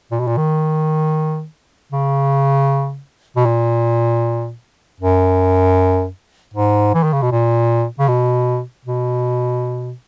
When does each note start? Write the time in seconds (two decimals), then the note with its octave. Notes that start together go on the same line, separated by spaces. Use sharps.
0.11 A#2
0.20 B2
0.27 A#2
0.37 D#3
1.92 C#3
3.36 B2
3.45 A#2
5.00 F#2
6.54 G#2
6.94 E3
7.03 D#3
7.13 C#3
7.22 B2
7.31 A#2
7.99 C#3
8.08 B2
8.85 B2